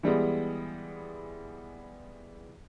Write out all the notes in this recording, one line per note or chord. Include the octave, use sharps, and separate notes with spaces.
E3 G3 G#3 B3